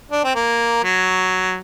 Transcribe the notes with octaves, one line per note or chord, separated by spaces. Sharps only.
D4
C4
A#3
F#3